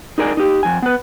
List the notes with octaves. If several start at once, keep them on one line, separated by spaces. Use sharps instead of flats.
D#4 G#4 A#4 D5 G#5
D#4 G4
F2 G#5
B3 B4